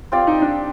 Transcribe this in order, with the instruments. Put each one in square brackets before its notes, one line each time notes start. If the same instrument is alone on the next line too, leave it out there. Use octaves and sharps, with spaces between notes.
[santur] C4 G4 D5 F5 [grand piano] F4
[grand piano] D#4
D4